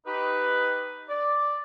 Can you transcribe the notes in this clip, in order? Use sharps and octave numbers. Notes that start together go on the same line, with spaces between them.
D#4 G4 B4
D5